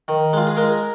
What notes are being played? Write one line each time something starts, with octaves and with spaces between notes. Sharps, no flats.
D#3
G#3 F4
G#4
G#3 A#4